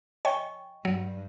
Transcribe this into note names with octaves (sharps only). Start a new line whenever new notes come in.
C#5 D#5 G5 G#5 C#6
G2 F#3